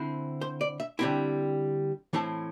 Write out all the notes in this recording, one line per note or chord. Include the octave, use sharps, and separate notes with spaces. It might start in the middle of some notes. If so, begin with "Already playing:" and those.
Already playing: D3 C4 E4
C5
D5
E5
D3 G3 C4 E4 G5
A2 E3 C4 E4 A5